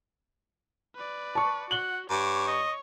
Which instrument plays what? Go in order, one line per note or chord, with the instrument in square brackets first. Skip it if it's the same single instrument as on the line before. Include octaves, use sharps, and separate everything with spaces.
[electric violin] B4 D5
[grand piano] A5 C#6
[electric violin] F#4 [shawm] F#5 [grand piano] F#7 G7
[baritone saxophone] G2 [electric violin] C#5 C#6 [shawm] D6
[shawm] D#5